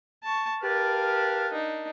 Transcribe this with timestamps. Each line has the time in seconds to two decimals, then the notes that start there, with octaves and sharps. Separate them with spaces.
0.24 A5 C#6
0.63 G4 A#4 B4 F5 A5
1.52 D4 D#4